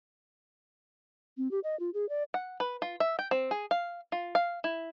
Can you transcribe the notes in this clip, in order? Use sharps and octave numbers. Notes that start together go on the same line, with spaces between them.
C4
G4
D#5
F4
G#4
D5
F#5
B4
F4
E5
G5
C4
G#4
F5
F4
F5
E4